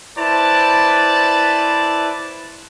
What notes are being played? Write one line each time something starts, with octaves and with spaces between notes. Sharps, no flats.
E4 B4 C5 D5 A5